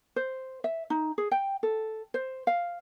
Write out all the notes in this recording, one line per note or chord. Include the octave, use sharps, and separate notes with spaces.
C5
E5
D#4
G#4
G5
A4
C5
F5